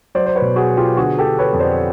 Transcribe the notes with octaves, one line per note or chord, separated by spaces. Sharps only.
F#3 C5 D5
C5
B4 C#5
B2
F#4 G#4
B3
F4 G4
D3 F#4 G#4
G4 A4
D3
B4 C#5
F2
C5 D5